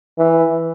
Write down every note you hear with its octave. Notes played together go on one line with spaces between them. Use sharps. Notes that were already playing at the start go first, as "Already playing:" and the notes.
E3